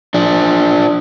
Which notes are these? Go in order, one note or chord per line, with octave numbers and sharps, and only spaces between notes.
F3 D4